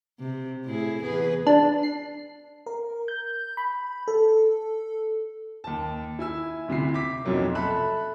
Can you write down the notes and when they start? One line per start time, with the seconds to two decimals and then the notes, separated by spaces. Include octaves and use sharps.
0.20 C3
0.65 A2 E4 G#4
1.01 E2 G#4 B4
1.47 D4
1.83 C7
2.66 A#4
3.08 G6
3.57 B5
4.08 A4
5.64 D#2 A5
6.19 E4 G#5 E6
6.68 D2 C3 E4 C7
6.94 D6 B6
7.25 B1 F2 C3 F#3 A#3
7.55 A4 E5 B5 F#6